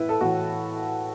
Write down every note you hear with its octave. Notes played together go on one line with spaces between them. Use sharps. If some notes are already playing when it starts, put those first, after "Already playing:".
Already playing: A2 E3 E4 B4
A4
A2 E3 A3 F#4